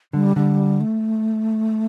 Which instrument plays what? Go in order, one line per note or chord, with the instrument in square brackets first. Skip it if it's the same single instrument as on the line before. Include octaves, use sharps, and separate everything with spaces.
[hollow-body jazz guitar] D3 [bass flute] G3
[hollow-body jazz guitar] D3 [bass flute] G3
[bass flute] A3